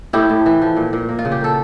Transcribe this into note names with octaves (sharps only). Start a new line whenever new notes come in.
A2 E4 G4
A2
E3
F3
A#2
A#2
A#3
F4
C#3
G4
A#3 A4